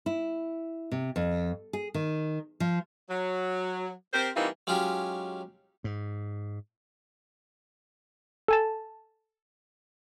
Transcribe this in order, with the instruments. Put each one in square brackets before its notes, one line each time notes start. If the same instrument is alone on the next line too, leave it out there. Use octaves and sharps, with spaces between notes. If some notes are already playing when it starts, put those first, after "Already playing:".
[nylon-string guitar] E4
C3
F2
G#4
D#3
F3
[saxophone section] F#3
C4 G4 A#4 C5
E3 G3 A#3 C4 D#4 F4
[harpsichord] F#3 G#3 C#4 D#4 F4 G4
[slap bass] G#2
[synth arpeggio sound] A4 G#5 A5